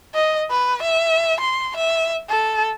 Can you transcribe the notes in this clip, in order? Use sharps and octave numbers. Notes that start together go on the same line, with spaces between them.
D#5
B4
E5
C6
E5
A4